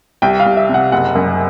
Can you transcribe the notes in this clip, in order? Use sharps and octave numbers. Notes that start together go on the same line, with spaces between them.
C2 G5
F5
C2
E5
C3 F#5
F#1 F#5
F#2